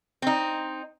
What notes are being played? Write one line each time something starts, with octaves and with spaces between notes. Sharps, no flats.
C4 D#4